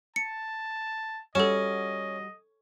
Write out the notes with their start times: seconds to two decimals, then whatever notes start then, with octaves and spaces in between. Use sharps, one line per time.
0.16 A5 C#7
1.35 G3 C#4 F#4 A4 D#5 E7